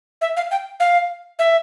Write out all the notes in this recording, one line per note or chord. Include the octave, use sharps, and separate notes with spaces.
E5
F5
G5
F5
E5